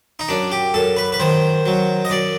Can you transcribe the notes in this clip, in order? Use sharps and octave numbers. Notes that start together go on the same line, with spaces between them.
D#4
F#2 D4
G4
F#2 A4
B4
B4
D#3 C5
F#3
D#5
F#2 D5